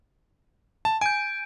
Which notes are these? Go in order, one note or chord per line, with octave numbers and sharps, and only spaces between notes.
A5
G#5 G6 D7